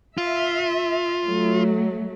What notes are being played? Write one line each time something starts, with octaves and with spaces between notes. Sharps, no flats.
F4 E5
F#3 A3